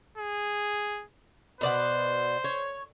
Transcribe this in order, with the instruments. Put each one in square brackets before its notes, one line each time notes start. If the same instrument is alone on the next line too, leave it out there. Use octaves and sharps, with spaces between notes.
[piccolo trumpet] G#4
[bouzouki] B2 D5 F#5 [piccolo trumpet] C5
[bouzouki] C#5